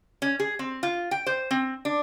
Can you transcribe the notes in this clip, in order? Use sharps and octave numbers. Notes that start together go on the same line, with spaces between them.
C#4
G#4
C4
F4
G5
C5
C4
D4